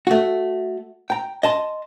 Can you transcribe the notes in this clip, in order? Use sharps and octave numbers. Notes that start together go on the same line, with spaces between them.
A3 F#4
G5 A#5
D#5 A5 C6